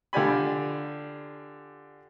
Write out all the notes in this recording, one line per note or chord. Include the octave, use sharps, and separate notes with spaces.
D3 F4 G4 D5 G#5 B5